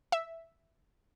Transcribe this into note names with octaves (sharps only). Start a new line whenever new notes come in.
E5